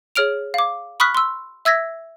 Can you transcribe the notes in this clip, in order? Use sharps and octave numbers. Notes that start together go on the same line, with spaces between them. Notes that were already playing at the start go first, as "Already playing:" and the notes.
G#4 C#5 F6 D7 F7
F5 D6
B5 C#6 D#6 F6 F#6 B6
C6 E6
E5 E6 G#6 A#6 B6